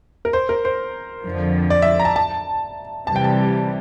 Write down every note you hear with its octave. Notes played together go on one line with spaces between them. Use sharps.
A#4
C5
A#4
C5
F2 D3 F3
D5
E5
A#5
A5
A5
C3 E3 G3 A5
G5
A5